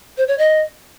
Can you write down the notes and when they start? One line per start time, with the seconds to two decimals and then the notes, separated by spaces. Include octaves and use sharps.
0.18 C5
0.28 C#5
0.38 D#5